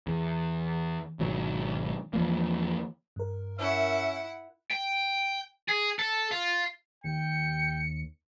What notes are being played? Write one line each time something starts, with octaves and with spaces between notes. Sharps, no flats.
E2
G#1 B2 F#3
E2 F3 A#3
G2 A#4
C#4 E4 E5 F#5
G5
G#4
A4
F4
D#2 G5 C#7